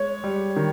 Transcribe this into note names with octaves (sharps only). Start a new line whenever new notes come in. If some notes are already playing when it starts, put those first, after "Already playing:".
Already playing: G#3 C#5
G3
D#3